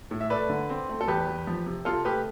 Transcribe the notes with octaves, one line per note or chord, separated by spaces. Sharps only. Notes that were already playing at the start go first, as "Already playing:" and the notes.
A2
E5
A3 B4 D5
D3
C4
A3
A4
E2 G4 B4
E2
F3
C3
C3 F4 A4
A3 G4 B4